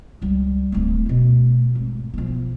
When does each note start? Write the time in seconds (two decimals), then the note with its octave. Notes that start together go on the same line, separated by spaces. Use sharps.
0.22 C#2 G3
0.72 D1 A3
1.06 B2 A3
1.75 G#1
2.14 B1 F3